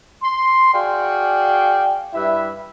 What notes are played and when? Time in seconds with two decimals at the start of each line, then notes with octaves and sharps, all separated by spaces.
0.22 C6
0.73 F#4 G#4 D5 F5 G5
2.14 G2 G3 E4 B4 E5